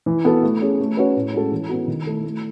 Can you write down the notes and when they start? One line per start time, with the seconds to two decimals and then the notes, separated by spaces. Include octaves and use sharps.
0.06 E3
0.25 B3 F#4 A4
0.43 A3
0.62 C#4 G#4
0.80 A3
0.97 C#4 F#4 B4
1.16 A2
1.33 G#3 C#4 F#4 A4
1.52 E3
1.69 B3 F#4
1.87 D#3
2.06 A3 E4 A4
2.24 A3